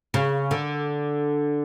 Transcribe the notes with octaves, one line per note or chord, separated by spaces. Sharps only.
C#3
D3